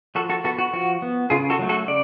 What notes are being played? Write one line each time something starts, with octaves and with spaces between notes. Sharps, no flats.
F3 F#4 A4
F#4 A4
B3 F#4 A4
F#4
F3 F#4
B3
C#3 F4 G#4
F#4 A4
F#3 A3
F#4 A4
C#3 D5